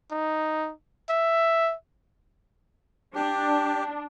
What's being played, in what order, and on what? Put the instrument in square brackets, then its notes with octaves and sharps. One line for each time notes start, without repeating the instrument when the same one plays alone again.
[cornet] D#4
E5
[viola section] D4 [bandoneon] G4